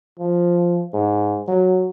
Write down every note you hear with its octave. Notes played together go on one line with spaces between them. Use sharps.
F3
G#2
F#3